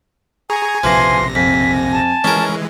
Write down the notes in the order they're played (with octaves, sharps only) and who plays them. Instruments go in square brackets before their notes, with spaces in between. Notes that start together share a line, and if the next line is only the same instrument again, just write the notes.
[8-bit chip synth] G#4 A#5 C#6 [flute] G#5
[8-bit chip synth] A#1 C3 A#6 [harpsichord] E3 F3 [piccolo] C6
[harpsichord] F2 [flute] G#5 [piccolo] B6
[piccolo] A5
[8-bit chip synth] E3 G#3 [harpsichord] C#4 A#4